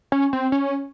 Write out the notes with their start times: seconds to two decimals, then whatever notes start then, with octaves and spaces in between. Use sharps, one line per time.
0.12 C#4
0.33 C4
0.52 C#4